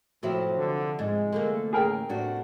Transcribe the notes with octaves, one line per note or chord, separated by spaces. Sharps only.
A2 C3 F3 F#3 C4 E4
D3
G#2 G#3
D3 A3 A#3
A1 G#4 A#4 G5
A2 C3 D4 F#4